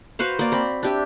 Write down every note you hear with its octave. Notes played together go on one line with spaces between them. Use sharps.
F#4 B4 C5 F5
A#3 D5
C4 B5
D4 G4 E5